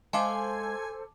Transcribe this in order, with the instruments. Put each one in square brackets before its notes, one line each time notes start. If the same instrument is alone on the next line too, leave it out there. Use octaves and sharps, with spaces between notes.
[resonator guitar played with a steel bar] G#3 F5 [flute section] A4 C5 [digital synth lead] G#5 [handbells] A5 D6